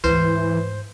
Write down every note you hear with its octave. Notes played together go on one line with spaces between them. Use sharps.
D2 G#2 E3 B4 C5